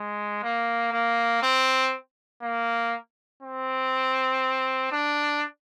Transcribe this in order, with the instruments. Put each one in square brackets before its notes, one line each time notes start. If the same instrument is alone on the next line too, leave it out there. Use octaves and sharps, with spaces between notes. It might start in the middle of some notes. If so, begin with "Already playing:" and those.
Already playing: [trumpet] G#3
A#3
A#3
C4
A#3
C4
D4